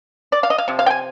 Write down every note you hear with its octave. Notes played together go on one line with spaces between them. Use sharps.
D5
F5
D#5
F5
C3 F3
F5
G5
G#5